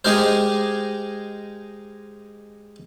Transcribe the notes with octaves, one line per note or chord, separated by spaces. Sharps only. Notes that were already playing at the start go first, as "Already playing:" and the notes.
G#3 D#4 G4 G#4 A#4 C5